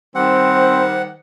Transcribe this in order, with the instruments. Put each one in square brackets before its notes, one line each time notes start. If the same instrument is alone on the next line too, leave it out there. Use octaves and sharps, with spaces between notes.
[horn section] D#3 G3 [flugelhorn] C4 [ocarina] C5 [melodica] F#5